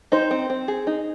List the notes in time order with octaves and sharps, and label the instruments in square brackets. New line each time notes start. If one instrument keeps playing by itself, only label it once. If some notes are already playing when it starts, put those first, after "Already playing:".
[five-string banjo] D#4 [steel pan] C5
[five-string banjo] C4
C4
G#4
D#4